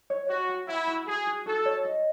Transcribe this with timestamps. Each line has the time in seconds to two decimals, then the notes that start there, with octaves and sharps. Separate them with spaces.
0.10 C#5
0.29 F#4 C#5
0.49 F#5
0.68 E4 F#5
0.87 F#4
1.07 F#4 G#4
1.27 F#4
1.46 F#4 A4
1.65 C#5
1.85 D#5